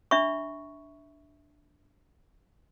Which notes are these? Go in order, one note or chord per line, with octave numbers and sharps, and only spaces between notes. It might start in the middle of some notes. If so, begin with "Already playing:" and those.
D4 E5 B5 C#6